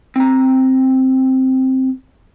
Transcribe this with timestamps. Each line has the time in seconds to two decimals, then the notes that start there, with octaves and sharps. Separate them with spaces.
0.16 C4 A#5